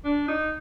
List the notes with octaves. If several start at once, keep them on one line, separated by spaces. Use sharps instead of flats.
D4
D#4